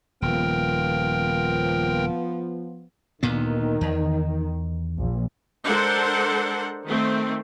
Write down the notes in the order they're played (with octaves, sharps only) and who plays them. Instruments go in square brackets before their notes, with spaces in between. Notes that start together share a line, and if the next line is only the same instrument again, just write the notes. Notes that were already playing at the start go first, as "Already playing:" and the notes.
[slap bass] D#1 [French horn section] F3 B3 [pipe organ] A#4 G5
[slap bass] D2 A#2 B3 [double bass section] D#3
[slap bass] E2
[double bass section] A#1
[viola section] G#3 D4 A4 A#4 C5 F#5
D#3 A3 C4